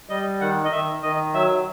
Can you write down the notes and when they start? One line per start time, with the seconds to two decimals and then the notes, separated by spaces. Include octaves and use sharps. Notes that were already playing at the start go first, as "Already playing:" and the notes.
0.09 G3 D#5
0.41 D#3 F#5
0.65 D#5
0.71 D#3 E5
1.03 D#3 D#5
1.34 F#3 E5